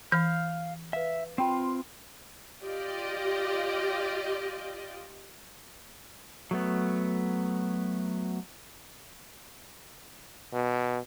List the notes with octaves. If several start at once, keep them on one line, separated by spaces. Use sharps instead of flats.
E3 F5 F6 G6
B4 E5 F5
C4 F4 G5 B5
F4 G4 D5 D#5
F#3 A3 B3
B2